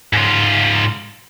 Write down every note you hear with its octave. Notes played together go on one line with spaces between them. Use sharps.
G#2 F4